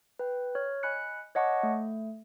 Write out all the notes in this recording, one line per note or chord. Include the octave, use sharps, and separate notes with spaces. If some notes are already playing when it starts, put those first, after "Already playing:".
B4 G5
C#5 F6
D#5 G#5 B5 F#6 C#7
C#5 D#5 F#5 A5 C#6 D6
A3